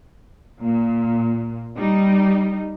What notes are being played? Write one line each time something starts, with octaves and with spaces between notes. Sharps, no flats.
A#2
G3 D#4